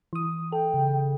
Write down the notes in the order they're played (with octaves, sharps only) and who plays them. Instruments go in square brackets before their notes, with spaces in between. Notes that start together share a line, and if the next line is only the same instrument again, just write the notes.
[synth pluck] E3 D#6
[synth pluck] A4 [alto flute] G5
[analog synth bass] C#3